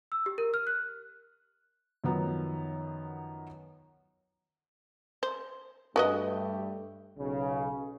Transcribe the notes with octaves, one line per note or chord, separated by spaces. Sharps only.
E6
G4
A#4
F6
F#6
F#2 D#3 F3 F#3 B3 D#4
C5
G2 A3 F#4 G4 B4 D#5
B1 C#3